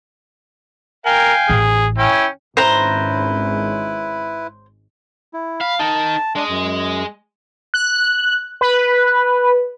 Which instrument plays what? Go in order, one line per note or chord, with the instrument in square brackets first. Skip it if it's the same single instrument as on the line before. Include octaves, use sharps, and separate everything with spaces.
[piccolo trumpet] A#4 [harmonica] F5 G5 G#5
[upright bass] A1 [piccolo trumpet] G#4
[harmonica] C#4 G5 [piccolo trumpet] E4
[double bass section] G#1 G#3 C#4 [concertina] E4 B4 [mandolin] C5 A#5
[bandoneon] E4
[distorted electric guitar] F5 [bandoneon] B5
[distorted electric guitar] D#4 A#4 [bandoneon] A5
[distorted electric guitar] G#3 D#5 [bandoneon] D4
[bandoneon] F#2
[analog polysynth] F#6
B4